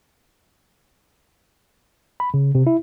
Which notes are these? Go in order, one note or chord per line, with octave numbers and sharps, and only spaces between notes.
B5
C#3
C3
E4